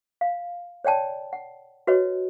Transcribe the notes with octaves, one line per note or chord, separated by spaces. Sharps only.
F5
C#5 D5 G5 A5
F#5
F#4 B4 C#5 D#5